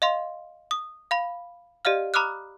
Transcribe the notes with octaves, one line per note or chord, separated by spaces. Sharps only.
D#5 F5 C6
D#6
F5 B5
G4 D5 D#5 F5 F6
A#5 B5 D6 D#6 F6 F#6